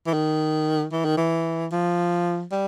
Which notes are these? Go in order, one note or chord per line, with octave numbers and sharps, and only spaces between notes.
E3
D#3
E3
D#3
E3
F3
G3